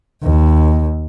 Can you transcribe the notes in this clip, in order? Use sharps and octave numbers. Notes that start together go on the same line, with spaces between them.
D#2